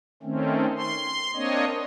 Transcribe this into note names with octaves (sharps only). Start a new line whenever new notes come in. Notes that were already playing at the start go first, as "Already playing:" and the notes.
D#3 A3 C4 C#4
C6
A#3 C4 D4 C#5 D#5